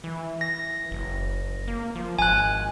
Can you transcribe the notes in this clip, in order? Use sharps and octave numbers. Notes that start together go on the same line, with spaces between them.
E3
A#6
F#1
A#3
F3
G#1 G#5 F#6